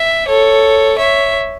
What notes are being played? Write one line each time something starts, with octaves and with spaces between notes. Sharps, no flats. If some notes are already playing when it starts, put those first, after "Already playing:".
Already playing: E5
A4 C#5
C#5 E5